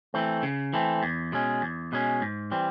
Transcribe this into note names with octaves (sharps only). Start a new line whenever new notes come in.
E3 A3 C4
C#3
E3 A3 C4
E2
B2 G#3 C#4
E2
B2 G#3 C#4
G#2
E3 G3 C4